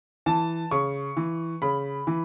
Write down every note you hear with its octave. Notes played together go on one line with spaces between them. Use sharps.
E3 A5
C#3 C#6
E3
C#3 B5
E3